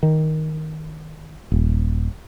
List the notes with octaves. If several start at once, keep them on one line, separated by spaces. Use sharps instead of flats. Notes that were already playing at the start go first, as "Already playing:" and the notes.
D#3
D#1